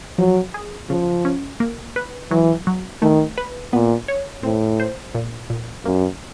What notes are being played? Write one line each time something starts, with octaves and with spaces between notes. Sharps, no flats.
F3 F#3
G#4
C#3 F3
C#4
A#3
B4
E3 F#3
F#3
D#3 A3
B4
A#2 B3
C#5
A2 C4
C5
A#2
A#2
F#2 A#3